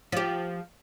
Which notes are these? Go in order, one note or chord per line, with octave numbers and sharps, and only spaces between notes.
F3 G4